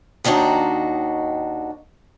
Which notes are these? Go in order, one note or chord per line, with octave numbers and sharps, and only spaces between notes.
D#2 D#3 D4 D#4 F#4